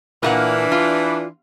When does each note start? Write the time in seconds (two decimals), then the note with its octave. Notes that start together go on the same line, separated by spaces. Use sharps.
0.23 A#2 E3 A#3 D4 F#5
0.72 F4